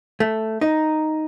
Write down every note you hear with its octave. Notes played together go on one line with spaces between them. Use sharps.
A3
D#4